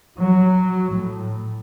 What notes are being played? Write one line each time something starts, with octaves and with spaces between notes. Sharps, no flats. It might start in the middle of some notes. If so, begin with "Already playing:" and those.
F#3
A2